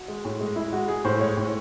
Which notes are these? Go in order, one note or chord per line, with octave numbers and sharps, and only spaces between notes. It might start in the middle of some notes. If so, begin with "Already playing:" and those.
Already playing: F#4
G#3
A2
G#3
G#3 E4
G#3 F#4
G#3 G#4
A2 C5
G#3 C#5
A2